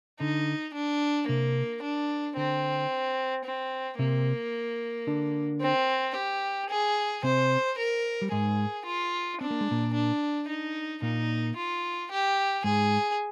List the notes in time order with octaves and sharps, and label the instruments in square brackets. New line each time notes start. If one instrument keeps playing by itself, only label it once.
[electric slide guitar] D3 [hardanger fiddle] D#4
[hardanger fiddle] D4
[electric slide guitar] C3 [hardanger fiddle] A#3
[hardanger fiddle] D4
[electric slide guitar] D3 [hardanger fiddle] C4
[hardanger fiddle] C4
[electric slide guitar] C3 C4 [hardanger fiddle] A#3
[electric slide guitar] D3 D4
[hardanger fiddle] C4
G4
G#4
[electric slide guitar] C3 C4 [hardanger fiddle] C5
[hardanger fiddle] A#4
[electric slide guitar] G3
[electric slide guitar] G#2 G#3 [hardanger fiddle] G#4
[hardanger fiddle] F4
[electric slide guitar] C4 [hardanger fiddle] D4
[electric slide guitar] A#3
G#3
A#2 A#3
[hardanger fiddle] D4
D#4
[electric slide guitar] A#2 A#3 [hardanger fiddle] D#4
[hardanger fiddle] F4
G4
[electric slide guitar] G#2 G#3 [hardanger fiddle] G#4